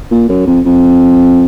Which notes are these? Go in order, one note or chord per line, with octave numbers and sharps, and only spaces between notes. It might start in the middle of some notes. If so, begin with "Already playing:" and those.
A#2
F#2
F2
F2